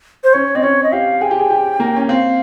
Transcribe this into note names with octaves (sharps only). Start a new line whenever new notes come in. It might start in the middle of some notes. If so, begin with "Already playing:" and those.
C5
C#4 C#5
C4 D#5
C#4 C#5
D#5
G4 F5
G#4 G5
G4
G#4
G4
A#3
C#4
C4 F5